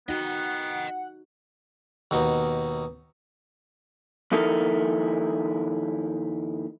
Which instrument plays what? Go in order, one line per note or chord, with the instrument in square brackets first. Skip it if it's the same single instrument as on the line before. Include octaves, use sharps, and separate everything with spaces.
[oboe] B3 [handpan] D#4 F#4 [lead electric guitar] D#5 G5 [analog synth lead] F#5
[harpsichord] D#2 B2 D#4
[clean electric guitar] D#2 F3 D#4 E4 A4 A#4